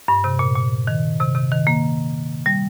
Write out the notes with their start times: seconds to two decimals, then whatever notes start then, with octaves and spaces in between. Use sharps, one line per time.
0.08 G2
0.24 C3
0.39 A#2
0.56 A#2
0.87 D#3
1.20 C3
1.35 C3
1.51 D#3
1.67 A#3
2.46 G3